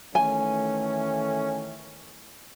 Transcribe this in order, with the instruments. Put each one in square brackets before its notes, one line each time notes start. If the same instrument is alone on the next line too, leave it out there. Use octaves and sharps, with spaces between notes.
[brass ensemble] D#3 E3 A3 [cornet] C#4 [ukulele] G#5